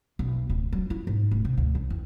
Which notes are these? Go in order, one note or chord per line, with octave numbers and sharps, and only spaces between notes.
B1
D1
F#3
E4
G#2
D1
C3
D2
C2
E2